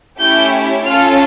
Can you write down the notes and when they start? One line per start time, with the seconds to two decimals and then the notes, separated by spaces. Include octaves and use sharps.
0.20 A3 C#4 E4 G4 G6
0.85 C#4 F4 A4 F6